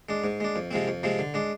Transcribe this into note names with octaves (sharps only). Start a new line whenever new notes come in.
G#3 D4
G#2
G#3 D4
F2
C3 F3 G#3 C4
F2
C3 F3 G#3 C4
D3
G#3 D4